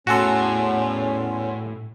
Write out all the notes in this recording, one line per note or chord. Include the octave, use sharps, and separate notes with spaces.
E2 A2 C#4 F#4 A4 F#5 G#5 C6